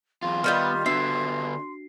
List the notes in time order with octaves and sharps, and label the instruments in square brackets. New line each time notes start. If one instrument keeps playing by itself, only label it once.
[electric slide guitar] E2 F4 [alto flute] C6
[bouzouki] D#3 G3 F4 [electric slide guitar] B3 [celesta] F6 G6
[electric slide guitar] D3 B3 [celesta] D4 F#4 C7 [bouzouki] E5